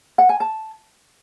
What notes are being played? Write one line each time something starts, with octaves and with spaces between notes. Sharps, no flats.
F#5
G#5
A5